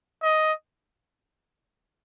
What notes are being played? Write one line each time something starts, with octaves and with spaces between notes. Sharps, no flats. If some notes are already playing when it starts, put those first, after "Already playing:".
D#5